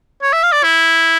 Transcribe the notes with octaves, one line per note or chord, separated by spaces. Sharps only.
C#5
E5
F5
D5
E4